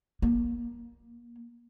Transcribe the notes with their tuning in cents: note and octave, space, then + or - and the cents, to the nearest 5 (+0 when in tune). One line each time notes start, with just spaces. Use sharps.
A#3 +30